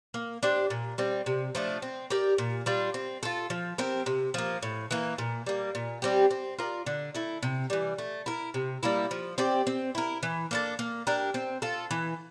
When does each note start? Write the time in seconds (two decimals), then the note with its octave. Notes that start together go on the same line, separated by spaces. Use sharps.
0.14 A#3
0.43 D4 G4 C5
0.70 A#2
0.98 G3 C4
1.26 C3
1.55 F3 A3 D4
1.82 C4
2.10 G4 A#4 D5
2.38 A#2
2.66 G3 D4 F4
2.94 C4
3.23 F4 A4
3.50 F3
3.78 C4 G4 A#4
4.06 C3
4.34 F3 A#3
4.62 A2
4.91 E3 A#3
5.18 A#2
5.46 G3 A#3
5.75 A#2
6.02 G3 C4 G4
6.31 C4
6.59 F4 A#4 D5
6.86 D3
7.15 A3 E4
7.43 C3
7.70 E3 G3
7.98 A3
8.26 E4 A#4
8.54 C3
8.83 G3 A#3 E4
9.11 F3
9.38 C4 G4 D5
9.67 C4
9.95 E4 A#4
10.23 E3
10.51 A#3 D4 A4
10.79 A#3
11.07 D4 G4 A#4
11.34 C4
11.62 F4 A4
11.91 E3